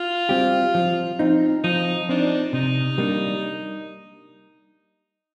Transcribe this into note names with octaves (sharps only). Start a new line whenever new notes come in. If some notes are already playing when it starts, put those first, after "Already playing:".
Already playing: F4
G3 C4 G4
F3
C4 D#4
F3 D#4
C4 D4 D#4
C3 D#4
G3 A#3 D4